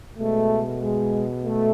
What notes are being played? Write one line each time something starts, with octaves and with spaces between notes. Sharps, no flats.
B2 G#3 A3
G#3
A3